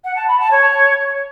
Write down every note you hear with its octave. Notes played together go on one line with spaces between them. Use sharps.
F#5
A5
B5
A5
C#5